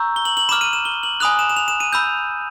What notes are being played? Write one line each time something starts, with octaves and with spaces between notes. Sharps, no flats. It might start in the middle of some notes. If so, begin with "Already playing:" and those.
Already playing: A#5 C#6 E6 G6
G7
F#7
F#7
B5 D6 F6 E7
D#7
E7
G7
F#7
G#5 B5 D#6 F#6 F7
E7
E7
F7
E7
D#7
B5 E6 G6